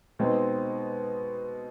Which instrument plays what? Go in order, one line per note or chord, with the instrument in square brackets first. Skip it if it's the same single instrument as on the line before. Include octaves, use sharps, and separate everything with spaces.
[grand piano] B2 G#3 C4 D#4